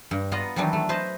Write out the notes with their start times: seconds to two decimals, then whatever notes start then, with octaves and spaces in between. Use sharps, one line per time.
0.11 G2
0.32 B3 F4 D#5 F#5 A#5
0.56 D#3 E3 F#3 G3 D4
0.73 A3
0.89 B4 C5 D#5 A5